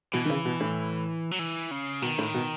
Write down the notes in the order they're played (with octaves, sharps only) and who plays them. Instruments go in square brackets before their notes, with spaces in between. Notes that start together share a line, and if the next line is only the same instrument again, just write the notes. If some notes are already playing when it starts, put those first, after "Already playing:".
[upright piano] B2 [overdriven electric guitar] E3
[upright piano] D#3
C#3
B2
A2
[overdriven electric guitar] F#3
E3
C#3
[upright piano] B2 [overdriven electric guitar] D#3
[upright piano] A2
B2